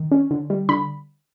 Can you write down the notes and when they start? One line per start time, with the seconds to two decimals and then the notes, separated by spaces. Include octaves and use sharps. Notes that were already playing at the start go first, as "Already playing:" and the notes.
Already playing: D#3
0.11 C#4
0.31 D3
0.50 G3
0.69 D3 B5